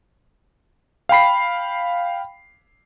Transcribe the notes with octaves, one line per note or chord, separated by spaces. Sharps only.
F5 G5 B5 C7